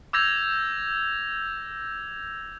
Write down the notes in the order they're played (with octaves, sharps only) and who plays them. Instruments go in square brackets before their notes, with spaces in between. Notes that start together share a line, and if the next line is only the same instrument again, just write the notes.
[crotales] D6 E6 G6 G#6 A#6 F7